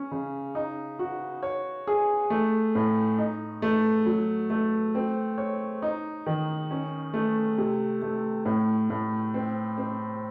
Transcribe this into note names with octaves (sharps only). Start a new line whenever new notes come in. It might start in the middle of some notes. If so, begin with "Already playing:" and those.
Already playing: C#4
C#3
D#4
F#4
C#5
G#4
A3
A2
D#4
A3
F#3
A3
C4
C#5
D#4
D#3
C#4
A3
C3
A3
A2
A2
C4
C4